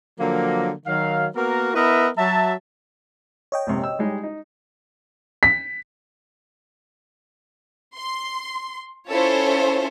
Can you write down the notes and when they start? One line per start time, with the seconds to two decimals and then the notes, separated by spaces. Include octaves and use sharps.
0.19 D3 F3 F#3 A#3
0.86 D#3 F#3 F5
1.35 A#3 B3 F#4 A#4
1.74 B3 E4 A#4 B4 D#5 E5
2.17 F#3 E5 A5
3.52 C#5 D#5 G5
3.67 A#1 G#2 C3
3.84 E6
3.99 G3 G#3 D#4
4.23 D#4
5.43 B6
7.96 C6
9.09 C#4 E4 F4 A4 C5 C#5